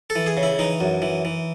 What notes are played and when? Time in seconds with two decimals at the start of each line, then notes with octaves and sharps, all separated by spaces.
0.10 A4
0.16 E3
0.26 G#4
0.37 C#3
0.43 E4
0.59 E3 D#4
0.80 F#2
1.02 E3
1.25 E3